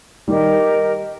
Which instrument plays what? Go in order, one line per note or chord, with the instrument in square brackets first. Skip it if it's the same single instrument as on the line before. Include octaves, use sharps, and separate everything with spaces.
[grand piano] D#3 G3 [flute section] G4 A#4 D#5